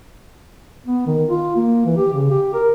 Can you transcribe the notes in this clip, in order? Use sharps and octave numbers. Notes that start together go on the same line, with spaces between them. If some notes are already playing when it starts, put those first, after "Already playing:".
B3
D#3
F4
A#3
E3
G4
C#3
G4
A#4